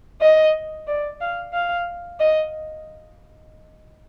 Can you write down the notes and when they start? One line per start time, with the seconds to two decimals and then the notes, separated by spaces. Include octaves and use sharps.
0.21 D#5
0.87 D5
1.21 F5
1.53 F5
2.20 D#5